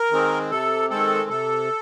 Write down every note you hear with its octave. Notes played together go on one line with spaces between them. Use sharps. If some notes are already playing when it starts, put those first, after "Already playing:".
Already playing: A#4
D#3 G#3 C4
C3 A4
D#3 G#3 C4 A4
C3 A4